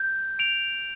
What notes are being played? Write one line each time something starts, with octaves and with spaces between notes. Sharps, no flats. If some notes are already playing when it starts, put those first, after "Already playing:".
Already playing: G6
D7 F7